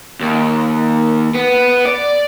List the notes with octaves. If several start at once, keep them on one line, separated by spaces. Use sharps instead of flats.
D#2
B3
D5